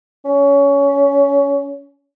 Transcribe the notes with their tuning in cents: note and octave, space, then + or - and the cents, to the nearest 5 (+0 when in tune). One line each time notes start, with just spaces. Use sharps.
C#4 +20